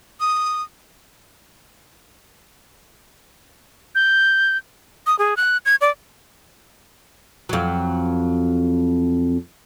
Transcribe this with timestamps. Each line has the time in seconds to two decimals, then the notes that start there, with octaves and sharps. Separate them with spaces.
0.20 D#6
3.95 G6
5.07 D#6
5.19 G#4
5.37 F#6
5.66 G#6
5.81 D5
7.49 F2 F#3